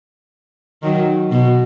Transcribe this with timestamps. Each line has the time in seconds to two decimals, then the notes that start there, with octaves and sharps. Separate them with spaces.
0.82 D#3 F#3
1.31 B2